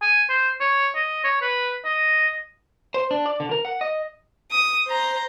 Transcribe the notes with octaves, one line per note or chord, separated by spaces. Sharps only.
G#5
C5
C#5
D#5
C#5
B4
D#5
C5
D4
D5
D3
A#4
F#5
D#5
D#6
C5 A#5